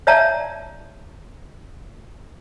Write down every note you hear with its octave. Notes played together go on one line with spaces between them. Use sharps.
C#5 D5 E5 F5 A5 A#5